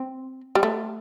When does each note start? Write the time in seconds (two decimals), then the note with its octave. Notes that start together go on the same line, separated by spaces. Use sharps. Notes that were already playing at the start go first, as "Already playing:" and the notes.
Already playing: C4
0.55 G3
0.63 A3